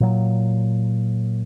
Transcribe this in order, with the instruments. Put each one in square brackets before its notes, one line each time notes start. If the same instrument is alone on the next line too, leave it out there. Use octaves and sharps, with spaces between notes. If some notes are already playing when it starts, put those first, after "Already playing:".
[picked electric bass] A#2 F#3